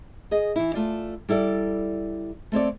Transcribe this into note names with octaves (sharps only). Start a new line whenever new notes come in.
G#4 D#5
E3 E4
A3 F4 D5
G3 E4 A4 D5
A3 C4 C#5 D5